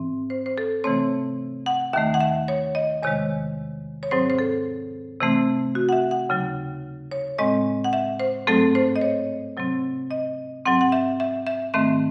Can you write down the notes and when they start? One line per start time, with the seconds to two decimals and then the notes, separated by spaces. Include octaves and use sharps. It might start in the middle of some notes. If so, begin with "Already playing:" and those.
Already playing: G#2 E3 C4
0.30 C5
0.46 C5
0.58 A4
0.84 C3 E3 A3 C4 C#5
1.66 F#5
1.93 D#2 D#3 A3 E5
2.14 F#5
2.20 E5
2.48 C#5
2.75 D#5
3.02 E2 C3 D#3 G#3 C#5
4.03 C#5
4.11 G#2 F#3 C4 C5
4.30 C5
4.39 A4
5.20 C3 E3 A3 C4
5.75 F#4
5.89 F#5
5.93 E5
6.11 F#5
6.29 D#2 C#3 F#3
7.11 C#5
7.39 A2 G#3 C4 D#5
7.84 F#5
7.93 E5
8.20 C5
8.47 G#2 F#3 A3 C4 A4
8.75 C5
8.96 D#5
9.01 C#5
9.57 C3 F#3 C4
10.11 D#5
10.65 G#2 F#3 C4 F#5
10.81 F#5
10.92 E5
11.20 E5
11.47 E5
11.74 G#2 D#3 A3 C4 E5